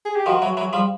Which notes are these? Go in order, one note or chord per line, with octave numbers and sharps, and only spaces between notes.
G#4
G4
D#3 F3 F#4
E3 F#3
E3 F#3
F3 G3